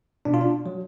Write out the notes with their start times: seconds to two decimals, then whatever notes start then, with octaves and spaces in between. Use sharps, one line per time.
0.25 B2 D4
0.34 F4
0.41 D4
0.66 F#3